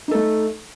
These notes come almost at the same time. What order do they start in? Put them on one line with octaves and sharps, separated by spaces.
D#4 A4 A3